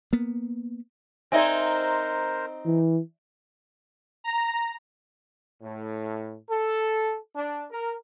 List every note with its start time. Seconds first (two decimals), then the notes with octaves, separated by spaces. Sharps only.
0.13 A#3 B3
1.32 C4 D#4 A#4 C5 D5 E5 G#5
2.65 E3
4.24 A#5
5.62 A2
6.49 A4
7.36 D4
7.70 A#4